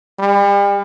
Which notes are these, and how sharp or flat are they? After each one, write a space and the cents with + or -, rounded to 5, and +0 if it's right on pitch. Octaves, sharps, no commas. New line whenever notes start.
G3 +40